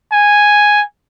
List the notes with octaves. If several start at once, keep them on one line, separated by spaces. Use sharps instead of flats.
G#5